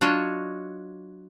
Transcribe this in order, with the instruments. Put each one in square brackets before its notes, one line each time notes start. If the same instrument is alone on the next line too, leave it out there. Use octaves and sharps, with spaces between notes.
[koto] F#3 D4 F4 F#4 C#5 D#5